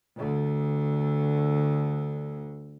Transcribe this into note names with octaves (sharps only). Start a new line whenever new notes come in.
D2 D3